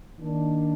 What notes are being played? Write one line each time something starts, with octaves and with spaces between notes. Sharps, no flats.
D#3 A#3 D4